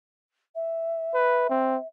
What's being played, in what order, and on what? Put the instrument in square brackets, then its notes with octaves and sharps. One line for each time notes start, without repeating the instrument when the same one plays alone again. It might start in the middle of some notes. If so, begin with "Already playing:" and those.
[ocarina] E5
[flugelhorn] B4
C4